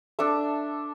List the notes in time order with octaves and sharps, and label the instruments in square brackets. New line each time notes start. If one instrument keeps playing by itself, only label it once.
[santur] D4 A4 E5